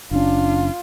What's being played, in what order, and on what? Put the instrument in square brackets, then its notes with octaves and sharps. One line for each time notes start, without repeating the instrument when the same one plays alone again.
[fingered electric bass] F#1 C#4 [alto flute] D4 [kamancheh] F4